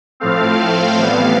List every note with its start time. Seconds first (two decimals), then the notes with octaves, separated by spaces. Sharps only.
0.20 A2 F3 A3 C4 F5
0.98 A2 E3 G3 B3